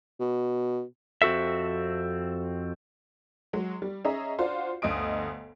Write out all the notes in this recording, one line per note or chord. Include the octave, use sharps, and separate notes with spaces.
B2
F2 C4 F#4 A4 E5
F#3 G#3
G3
C#4 G#4 D#5 E5 A#5
D4 F4 F#4 C5
G1 D2 D#5 D#6 D7